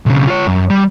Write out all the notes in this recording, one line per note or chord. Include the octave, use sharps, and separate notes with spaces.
B1 C#3
F4 C#5
F#2
G3